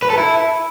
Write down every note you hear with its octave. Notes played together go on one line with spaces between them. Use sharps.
B4
A4
E4